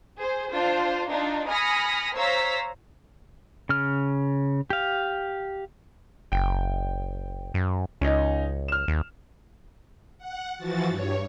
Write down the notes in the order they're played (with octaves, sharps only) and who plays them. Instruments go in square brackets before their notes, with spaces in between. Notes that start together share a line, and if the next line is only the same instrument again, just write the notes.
[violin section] G#4 C5
D4 F4 C5
D4 D#4 F4 D5
G#5 B5 D#6 F6 A#6 C#7
C5 C#5 F5 A#5 E6 B6
[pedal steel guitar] C#3 F6
G4 F5
[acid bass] F#1 [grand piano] G5
[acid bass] F#2
[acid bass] C#2 [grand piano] C#4 D#4
[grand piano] F6 E7
[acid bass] D#2
[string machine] F#5
E3 F3 F#4 A6
G2 C#5